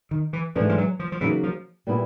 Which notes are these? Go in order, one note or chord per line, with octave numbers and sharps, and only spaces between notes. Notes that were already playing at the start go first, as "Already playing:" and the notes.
D#3
E3
G#2 E3 F3 A3 D4
F3
F#3
F3
F3
C#3 E3 F#3 A#3 D#4
F3
A#2 G3 B3 E4